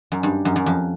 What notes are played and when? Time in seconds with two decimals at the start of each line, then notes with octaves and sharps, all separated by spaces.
0.12 F#2
0.23 G2
0.45 F#2
0.56 F#2
0.66 F2